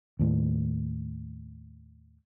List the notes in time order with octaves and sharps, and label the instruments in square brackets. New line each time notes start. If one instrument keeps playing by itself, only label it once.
[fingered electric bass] D#2 A2